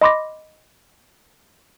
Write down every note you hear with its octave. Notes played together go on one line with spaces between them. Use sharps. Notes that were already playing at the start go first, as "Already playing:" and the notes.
D#5 B5 C6 D6 A#6